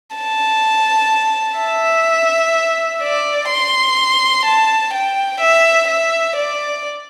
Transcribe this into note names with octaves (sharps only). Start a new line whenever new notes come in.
A5
E5
D5
C6
A5
G5
E5
E5
D5